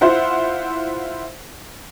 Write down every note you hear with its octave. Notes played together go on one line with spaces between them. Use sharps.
E4 F4 C5 E5 F#5